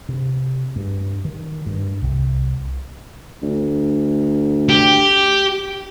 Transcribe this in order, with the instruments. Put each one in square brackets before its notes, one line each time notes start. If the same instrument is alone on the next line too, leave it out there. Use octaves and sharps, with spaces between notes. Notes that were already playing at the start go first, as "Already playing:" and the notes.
[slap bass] C3
G2
D#3
G2
C2
[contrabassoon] D2
[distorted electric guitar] G4